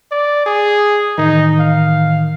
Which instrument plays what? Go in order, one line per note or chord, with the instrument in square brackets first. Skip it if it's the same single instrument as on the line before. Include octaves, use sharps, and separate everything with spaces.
[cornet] D5
G#4
[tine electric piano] A2 D#3 E3 [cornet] D#4
[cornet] F5